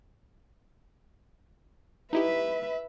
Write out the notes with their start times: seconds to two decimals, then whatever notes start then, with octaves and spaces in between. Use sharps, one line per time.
2.13 D#4 E4 G4 B4 E5